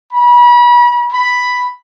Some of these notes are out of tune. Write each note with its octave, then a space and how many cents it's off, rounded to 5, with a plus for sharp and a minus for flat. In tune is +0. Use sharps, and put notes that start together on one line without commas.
B5 -35
B5 +5